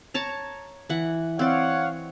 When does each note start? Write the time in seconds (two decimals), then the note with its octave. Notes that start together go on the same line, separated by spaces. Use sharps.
0.14 C#5 A5 A#5
0.90 E3 F#5
1.39 C4 C#5 D5 F5 F#5